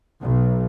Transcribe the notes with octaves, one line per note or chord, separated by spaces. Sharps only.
B1